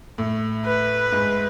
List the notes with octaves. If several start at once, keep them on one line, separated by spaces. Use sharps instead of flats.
A2
B4
G#2